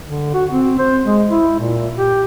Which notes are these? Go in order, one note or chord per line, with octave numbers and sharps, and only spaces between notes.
D3
F#4
C4
C5
G#3
E4
A#2
G4